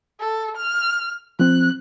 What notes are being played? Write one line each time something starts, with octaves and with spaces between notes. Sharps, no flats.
A4
F6
F3 C4 F#6